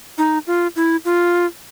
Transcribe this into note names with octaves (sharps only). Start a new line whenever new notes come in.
D#4
F4
E4
F4